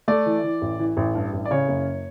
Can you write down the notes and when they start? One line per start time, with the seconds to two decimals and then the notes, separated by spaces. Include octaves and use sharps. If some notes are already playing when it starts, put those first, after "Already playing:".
0.08 A3 D5
0.26 E3
0.44 E3
0.62 A1
0.79 E3
0.97 A1
1.15 G2
1.33 A1
1.46 D5
1.51 C#3 C#5
1.68 F#1